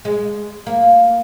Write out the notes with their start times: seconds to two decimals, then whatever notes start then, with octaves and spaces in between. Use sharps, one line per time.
0.05 G#3
0.67 A#3